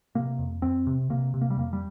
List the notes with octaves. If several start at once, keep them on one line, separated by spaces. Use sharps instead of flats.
C3 A#3
F2
F2 C4
C3
C3 A#3
C3
A#3
G3
F2 A#3
G3